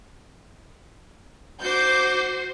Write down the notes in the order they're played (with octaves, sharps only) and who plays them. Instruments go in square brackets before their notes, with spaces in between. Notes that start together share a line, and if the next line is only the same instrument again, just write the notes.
[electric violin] F#4 C5 [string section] D6 G6